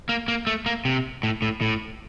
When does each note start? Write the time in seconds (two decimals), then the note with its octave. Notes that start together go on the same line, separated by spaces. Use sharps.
0.09 A#3
0.28 A#3
0.47 A3
0.66 A#3
0.85 C3
1.23 A2
1.42 A2
1.61 A2